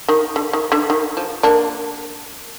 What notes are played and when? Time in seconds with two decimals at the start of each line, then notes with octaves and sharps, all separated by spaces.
0.08 D#3
0.36 D3
0.53 D#3
0.72 D3
0.90 D#3
1.17 F3
1.43 A#3 D4